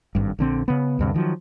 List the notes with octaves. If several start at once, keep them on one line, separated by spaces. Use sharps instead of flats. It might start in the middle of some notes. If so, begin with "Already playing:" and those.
G#1 G2
A#1 D3 C4
C#3 B3
D2 G2 C3
D#3 F3 F#3